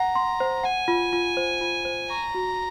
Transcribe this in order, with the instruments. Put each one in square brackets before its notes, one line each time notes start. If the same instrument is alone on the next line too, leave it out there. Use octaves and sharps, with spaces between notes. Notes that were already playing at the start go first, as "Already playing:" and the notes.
Already playing: [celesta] F#5 [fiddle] A#5
[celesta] C6
C5
[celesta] F#5 [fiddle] G#5
[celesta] F4
F4
C5
F4
C5
[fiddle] A#5 [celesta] C#6
[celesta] F#4